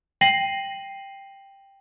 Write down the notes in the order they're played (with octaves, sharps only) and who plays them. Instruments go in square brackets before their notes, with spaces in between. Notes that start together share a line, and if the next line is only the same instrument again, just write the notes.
[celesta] G5 A#6 C7 D#7 F#7